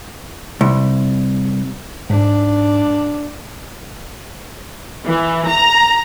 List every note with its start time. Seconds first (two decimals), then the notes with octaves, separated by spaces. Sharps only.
0.61 C2
2.10 G#2 D4
5.07 E3
5.47 A#5